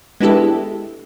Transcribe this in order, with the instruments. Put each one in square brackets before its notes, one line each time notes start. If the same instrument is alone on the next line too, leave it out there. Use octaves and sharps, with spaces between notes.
[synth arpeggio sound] G#3 B3 D4 E4 G4 A4